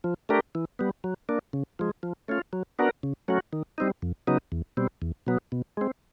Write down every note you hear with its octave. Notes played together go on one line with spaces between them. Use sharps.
F3
A3 D4 G4 A#4
E3
G3 B3
F#3
A#3 D4
C#3
F3 G#3
F3
A3 C#4 F4
F#3
B3 D4 F#4 A#4
C#3
F#3 A3 C#4 F#4
D#3
G3 C4 D#4
F2
C#3 F#3 B3 D#4
E2
B2 G3 C4
E2
B2 F#3 B3
B2
G#3 C4